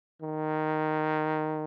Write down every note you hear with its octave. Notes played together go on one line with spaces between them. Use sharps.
D#3